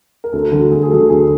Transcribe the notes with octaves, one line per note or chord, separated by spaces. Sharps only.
A#4
D2 A4
D3 F#3 A3
D2 G#4
G#4
D3 F#3 A3 A4
D2 G#4